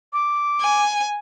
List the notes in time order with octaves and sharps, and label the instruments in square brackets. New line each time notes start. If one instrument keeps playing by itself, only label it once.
[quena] D6
[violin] G#5